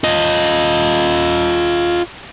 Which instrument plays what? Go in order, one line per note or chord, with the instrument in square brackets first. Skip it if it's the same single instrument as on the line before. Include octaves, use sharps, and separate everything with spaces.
[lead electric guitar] F4 D#5